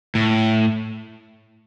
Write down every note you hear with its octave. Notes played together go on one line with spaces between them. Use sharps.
A2